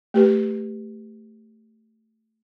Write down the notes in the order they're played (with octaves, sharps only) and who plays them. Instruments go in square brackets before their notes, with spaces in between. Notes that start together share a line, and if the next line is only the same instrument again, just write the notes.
[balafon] A3 G4 B4